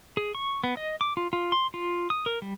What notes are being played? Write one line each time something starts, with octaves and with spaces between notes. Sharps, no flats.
G#4
C#6
B3
D#5
D6
F4
F4
C6
F4
D#6
A#4
G3